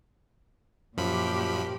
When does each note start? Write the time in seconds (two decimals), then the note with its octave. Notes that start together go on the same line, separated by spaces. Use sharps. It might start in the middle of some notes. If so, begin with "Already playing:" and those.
0.97 F#2 A#2 F3 G4 B5